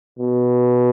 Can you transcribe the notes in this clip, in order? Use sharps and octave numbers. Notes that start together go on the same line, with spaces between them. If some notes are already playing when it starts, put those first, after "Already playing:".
B2